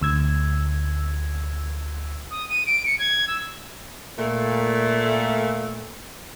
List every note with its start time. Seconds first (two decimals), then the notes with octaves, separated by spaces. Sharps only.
0.01 D2 E6 G#6
2.31 D#6
2.49 D#7
2.67 D7
2.86 C#7
2.99 G#6
3.28 E6
4.19 A#2 A3